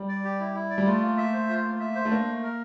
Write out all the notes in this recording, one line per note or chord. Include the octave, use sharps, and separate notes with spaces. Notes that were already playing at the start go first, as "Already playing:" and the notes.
Already playing: G3
D5
G4
E4
E4
D5
G3
A3 F4
A#3
E5
C5
F4
A#3
E5
C5
A3
A#3 D4
A3
A#4